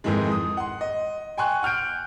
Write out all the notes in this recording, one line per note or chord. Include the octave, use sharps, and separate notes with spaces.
F2 G#2 D#3 E3 G#3
D#6
F#5 C6
D#5
G5 G#5 C6 C#6 F#6
F#5 F6 G6 D7